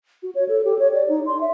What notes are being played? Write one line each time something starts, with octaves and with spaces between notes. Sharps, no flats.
F#4
C#5
A4
G4
C#5
D5
D#4
C6
E5